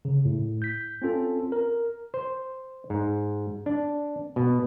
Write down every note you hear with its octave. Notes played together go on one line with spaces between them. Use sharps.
C#3
A2
G6 B6
C4 C#4 F4 A4
A#4
C5
G#2
D4
B2